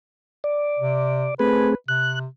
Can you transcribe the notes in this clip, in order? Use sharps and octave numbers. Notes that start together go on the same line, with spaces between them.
D5
C3
A3 C4 G#4 B4
C3 F#6